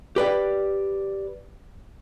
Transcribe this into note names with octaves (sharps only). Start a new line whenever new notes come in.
G4 B4 D5 G5